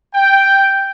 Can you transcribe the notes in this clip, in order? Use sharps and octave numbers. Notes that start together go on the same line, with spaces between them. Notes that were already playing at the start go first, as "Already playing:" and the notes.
G5